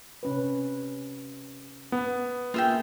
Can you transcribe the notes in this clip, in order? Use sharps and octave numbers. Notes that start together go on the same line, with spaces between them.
C3 C#4 B4
B3
A#3 F4 G#4 E5 G5